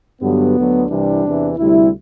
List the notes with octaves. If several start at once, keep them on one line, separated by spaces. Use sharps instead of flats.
G2 D3 F#3 B3
D2 D3 F#3
C2 C3 E3 G3 D4
E2 C3 E3
D2 C3 G3 E4